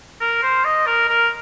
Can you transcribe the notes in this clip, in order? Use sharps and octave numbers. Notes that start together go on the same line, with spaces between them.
A#4
C5
D#5
A#4
A#4